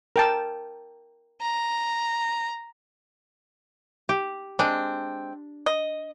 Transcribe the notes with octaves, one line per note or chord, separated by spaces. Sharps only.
A#4 G5 A5
A#5
G4
G#3 C4 D4
D#5